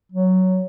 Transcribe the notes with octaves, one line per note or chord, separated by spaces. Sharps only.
F#3